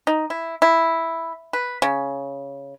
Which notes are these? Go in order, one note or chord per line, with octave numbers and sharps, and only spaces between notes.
D#4
E4
E4
B4
C#3